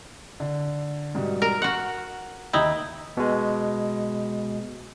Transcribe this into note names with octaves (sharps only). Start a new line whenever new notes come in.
D3
G#2 B2 G3
A#4
F#4 F#5 F6
D#2 D#4 E4 G5
B2 G#3